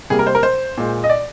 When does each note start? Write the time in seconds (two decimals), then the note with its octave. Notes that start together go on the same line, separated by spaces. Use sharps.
0.10 C3 G3 A#3 G#4
0.19 A#4
0.27 C5
0.35 A#4
0.43 C5
0.77 A#2 G#3
1.04 D#5
1.09 D5